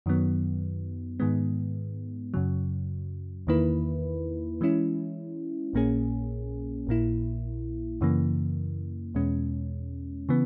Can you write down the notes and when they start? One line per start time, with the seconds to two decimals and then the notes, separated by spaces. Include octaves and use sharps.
0.06 F#2 D#3 F#3 B3
1.20 G#2 D#3 G#3 B3
2.34 F#2 C#3 F#3
3.47 E2 D#3 A#3 E4 B4
4.61 E3 G#3 C#4 E4
5.73 A#1 A#2 A#3 C#4 G#4
6.87 A#1 A#2 A#3 E4
8.01 F#2 C#3 E3 A#3
9.15 E2 B2 G#3 C#4
10.29 C#3 E3 B3